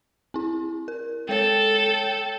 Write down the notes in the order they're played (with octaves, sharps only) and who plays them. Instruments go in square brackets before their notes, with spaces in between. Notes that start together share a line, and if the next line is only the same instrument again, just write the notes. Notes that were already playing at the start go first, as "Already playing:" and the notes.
[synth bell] C4 E4
A#4
[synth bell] G#3 C#5 [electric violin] A4 [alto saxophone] G5